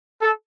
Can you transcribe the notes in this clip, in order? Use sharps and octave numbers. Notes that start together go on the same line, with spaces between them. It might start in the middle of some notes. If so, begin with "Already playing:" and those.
A4